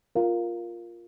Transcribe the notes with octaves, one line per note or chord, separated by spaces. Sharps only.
F4 A#4 F5